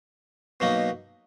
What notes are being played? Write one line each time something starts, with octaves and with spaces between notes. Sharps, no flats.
B2 F#3 A#3 D#4